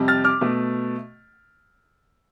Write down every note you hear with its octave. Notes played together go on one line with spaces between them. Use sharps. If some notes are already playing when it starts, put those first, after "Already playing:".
Already playing: F2 C3 G3
F6 A6
D6 F6
B2 A3